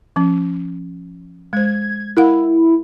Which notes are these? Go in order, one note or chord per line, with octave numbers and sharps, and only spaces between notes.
F3 C#4
G#3 C5 G#6
E4 A#4 F5 F#5